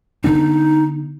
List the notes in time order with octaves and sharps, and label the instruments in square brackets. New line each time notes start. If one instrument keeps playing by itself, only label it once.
[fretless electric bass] D3 B3 D4 [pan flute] D#4